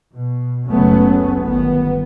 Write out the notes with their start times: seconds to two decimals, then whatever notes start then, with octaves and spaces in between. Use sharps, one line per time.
0.15 B2
0.69 F#1 C#2 F#3 A3 B3 C#4
1.43 G1 D#3 B3